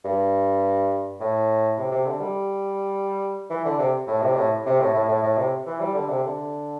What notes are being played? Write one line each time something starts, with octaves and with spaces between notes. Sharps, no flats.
G2
A2
C3
C3
D3
G3
E3
D3
C3
A2
C3
A2
C3
A2
A2
A2
A2
C3
E3
G3
D3
C3
D3